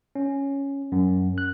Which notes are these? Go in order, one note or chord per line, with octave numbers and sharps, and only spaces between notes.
C#4
F#2
F#6